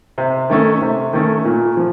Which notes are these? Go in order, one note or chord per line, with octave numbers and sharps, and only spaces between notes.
C3
D#3 A3 C#4 A4
C3
D#3 A3 C#4 A4
A#2
F3